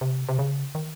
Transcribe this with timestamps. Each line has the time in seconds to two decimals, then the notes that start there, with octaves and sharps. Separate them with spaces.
0.01 C3
0.29 C3
0.39 C#3
0.75 D#3